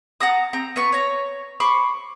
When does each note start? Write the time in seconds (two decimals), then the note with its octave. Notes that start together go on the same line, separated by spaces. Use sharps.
0.20 F#5 A5 A#5 D#6
0.53 C4 A#5
0.76 B3 B4 C#6
0.92 C#5 A#5
1.60 C5 B5 C#6 D6